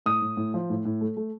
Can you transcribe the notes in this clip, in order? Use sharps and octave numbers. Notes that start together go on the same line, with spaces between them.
A2 D#6
A2
A2
F3
A2
A2
A3
A3